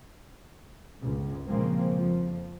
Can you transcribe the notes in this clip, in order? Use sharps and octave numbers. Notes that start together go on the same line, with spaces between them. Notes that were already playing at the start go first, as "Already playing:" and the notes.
G1 C#2 G#2
A#2 C#3 F3 G#3 A#3 C4
F2 F3